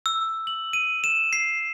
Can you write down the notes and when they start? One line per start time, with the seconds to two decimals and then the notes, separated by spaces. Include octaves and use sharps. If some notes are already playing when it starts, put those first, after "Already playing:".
0.06 E6
0.47 F#7
0.73 D#7
1.04 E7
1.33 C7